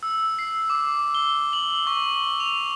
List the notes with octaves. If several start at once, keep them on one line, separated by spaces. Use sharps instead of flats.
E6
C7
D6
G7
F#7
C#6
F7